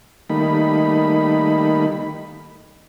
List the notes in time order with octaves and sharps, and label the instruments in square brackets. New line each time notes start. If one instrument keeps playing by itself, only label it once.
[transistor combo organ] D#3 G3 A3 A#3 D#4 B5